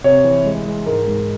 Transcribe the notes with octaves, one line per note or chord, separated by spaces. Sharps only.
C3 C#5
E3
G#3
G#3
G#2 A#4
G#2